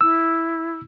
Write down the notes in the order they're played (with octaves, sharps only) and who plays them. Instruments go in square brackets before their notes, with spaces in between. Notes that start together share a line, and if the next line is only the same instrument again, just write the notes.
[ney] E4 [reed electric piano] E6